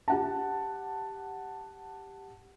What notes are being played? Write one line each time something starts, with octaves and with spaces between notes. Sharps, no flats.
G4 F#5 A5